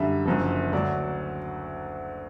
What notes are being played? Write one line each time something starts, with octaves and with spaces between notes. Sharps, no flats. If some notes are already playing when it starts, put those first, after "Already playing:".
Already playing: F#2 D3 G3 E5
F#1 F#2 D3 F3
D2 D3 F#3 D5